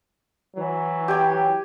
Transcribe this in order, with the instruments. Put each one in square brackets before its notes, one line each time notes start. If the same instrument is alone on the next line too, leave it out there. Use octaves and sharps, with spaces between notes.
[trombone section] E3 F#3
[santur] G4 G5 G#5